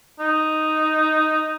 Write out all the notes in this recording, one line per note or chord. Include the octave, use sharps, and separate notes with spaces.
D#4